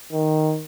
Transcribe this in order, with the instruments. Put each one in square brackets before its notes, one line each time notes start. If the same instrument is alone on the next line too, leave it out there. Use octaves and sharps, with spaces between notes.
[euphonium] D#3